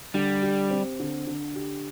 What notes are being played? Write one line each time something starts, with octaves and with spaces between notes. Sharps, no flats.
D3 G3
G4
C4
D3
D3
G4